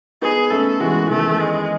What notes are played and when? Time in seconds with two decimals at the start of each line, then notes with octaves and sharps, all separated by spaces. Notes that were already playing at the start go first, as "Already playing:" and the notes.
0.22 B3 D#4 G#4
0.51 A3 C#4 A4
0.80 E3 G#3 F#4
1.10 D#3 A3
1.40 G#3